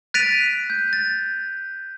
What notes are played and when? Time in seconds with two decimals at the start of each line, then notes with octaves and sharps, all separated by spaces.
0.14 F#6 A6 B6 D7 D#7 F7
0.70 G6
0.93 A6